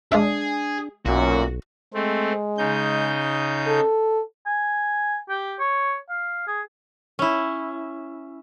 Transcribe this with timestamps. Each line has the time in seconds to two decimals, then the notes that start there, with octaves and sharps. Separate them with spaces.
0.12 G#3 D4 F4 G#4 E5
1.06 B1 F#2 A#2 F#4
1.94 G#3 A3 C4
2.58 C#3 D#4 G6
3.67 A4
4.46 G#5
5.30 G4
5.60 C#5
6.09 F5
6.47 G#4
7.19 C#4 E4